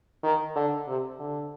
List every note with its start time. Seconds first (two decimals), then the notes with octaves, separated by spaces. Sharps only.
0.23 D#3
0.56 D3
0.88 C3
1.19 D3